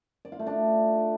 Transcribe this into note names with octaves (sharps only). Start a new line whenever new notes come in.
D5
F4
A3
D4